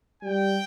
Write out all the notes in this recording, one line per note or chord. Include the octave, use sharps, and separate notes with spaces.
G3 G5